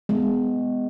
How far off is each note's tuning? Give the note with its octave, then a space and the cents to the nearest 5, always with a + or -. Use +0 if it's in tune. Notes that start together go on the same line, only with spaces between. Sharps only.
G#3 -5 B3 +20